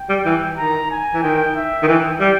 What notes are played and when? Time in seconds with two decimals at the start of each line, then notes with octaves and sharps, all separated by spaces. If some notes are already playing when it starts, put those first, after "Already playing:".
Already playing: G5
0.09 G3
0.25 E3
0.57 D#3 A#5
0.91 G#5
1.14 E3
1.22 D#3 G5
1.56 E5
1.83 D#3
1.87 E3 G5
2.20 G3